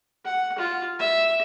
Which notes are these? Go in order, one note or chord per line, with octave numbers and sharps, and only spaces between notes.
F#5
F4
E5